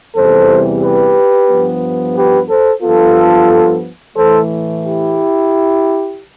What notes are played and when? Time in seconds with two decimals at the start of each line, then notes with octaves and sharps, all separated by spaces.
0.16 E2 C3 E3 G3 A4 C5
0.82 G4 B4
1.49 G2 F3 B3
2.16 G4 B4
2.49 A4 C5
2.82 G2 F3 B3 F4 A4
4.15 A2 E3 A3 A4 C5
4.83 E4 G4